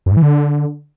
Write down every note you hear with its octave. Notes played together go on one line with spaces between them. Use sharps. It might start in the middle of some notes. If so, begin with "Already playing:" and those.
F#2
G#2
E3
D3